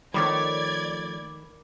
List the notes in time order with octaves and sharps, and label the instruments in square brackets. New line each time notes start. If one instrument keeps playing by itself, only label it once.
[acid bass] D#3 [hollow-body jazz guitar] F3 A3 C#5 [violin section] D5 G#6 [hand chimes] B5 D6